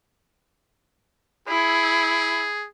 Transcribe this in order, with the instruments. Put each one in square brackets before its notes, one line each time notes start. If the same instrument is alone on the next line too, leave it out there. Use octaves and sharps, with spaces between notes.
[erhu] E4 [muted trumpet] G#4